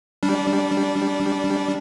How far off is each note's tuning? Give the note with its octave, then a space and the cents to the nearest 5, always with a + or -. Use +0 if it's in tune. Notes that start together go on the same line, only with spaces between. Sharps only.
G3 +0 D4 -20